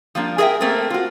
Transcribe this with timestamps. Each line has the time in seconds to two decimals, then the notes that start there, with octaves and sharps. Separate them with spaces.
0.15 F3 G3 A#3 D4
0.38 G#4 A#4 D#5 E5 G5
0.60 A3 A#3 C4 A4 A#4
0.90 F4 F#4